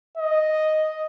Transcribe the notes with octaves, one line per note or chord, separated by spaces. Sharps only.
D#5